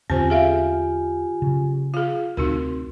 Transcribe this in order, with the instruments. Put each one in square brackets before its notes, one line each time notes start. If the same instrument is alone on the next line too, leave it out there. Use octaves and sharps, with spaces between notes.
[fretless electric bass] E2 D3 C#4 [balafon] C4 C5 [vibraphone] F4 G4 G#5
[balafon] G#4 E5 F5
[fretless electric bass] C#3 F#3
[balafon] F4 G#4 [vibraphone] F5
[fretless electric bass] D2 C3 [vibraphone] C4 [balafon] D#4 F#4 A#4